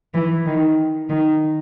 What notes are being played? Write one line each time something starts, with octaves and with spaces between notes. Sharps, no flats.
E3
D#3
D#3